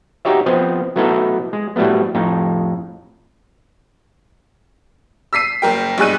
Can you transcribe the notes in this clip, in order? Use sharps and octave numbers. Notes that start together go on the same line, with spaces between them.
D#4 F#4 G4 C#5 E5
F3 B3 C4 D#5
F#3 A3 B3 D#4 E4 A4
G#3
A2 F#3 G3 A3 B3
F2 A2 D#4
E6 B6 C7 D#7
F#1 A#4 G5
B1 G2 G#3 G#4 F#6 D#7